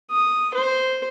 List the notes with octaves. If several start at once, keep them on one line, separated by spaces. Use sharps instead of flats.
D#6
C5